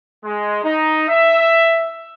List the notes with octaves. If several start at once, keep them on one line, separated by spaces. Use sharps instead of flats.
G#3
D#4
E5